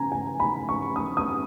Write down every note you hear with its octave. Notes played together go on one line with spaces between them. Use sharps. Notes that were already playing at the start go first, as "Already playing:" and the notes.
Already playing: C#3 G#5 A#5
G#5
B5
C#6
D#6
D#6